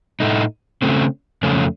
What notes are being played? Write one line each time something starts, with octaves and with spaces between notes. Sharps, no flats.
A2 A3 D#4
C#3 A3 C4
F2 C#3 A3 C#4